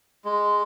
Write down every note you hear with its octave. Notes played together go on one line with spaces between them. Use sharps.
G#3